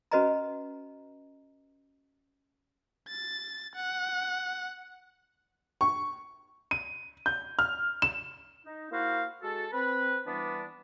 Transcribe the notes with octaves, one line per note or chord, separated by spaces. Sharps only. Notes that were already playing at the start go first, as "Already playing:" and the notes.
C#4 F#4 B4 D#5 G#5 A#5
A6
F#5
C#6
D#7
G6
F6
E7
D#4
A#3 E4 F#4 C5 F5
G#3 F#4 A4
C4 B4
E3 G3 B3 D4